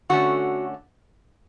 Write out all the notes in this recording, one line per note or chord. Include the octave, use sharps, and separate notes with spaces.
D3 A3 C#4 F#4